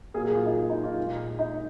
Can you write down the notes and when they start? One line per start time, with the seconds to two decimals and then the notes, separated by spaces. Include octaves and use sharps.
0.14 A#2 F#3 A#3 G#4
0.25 G#4
0.35 F4
0.46 D#4
0.70 D#4
0.84 F4
0.97 A#2 G#3
1.39 D#4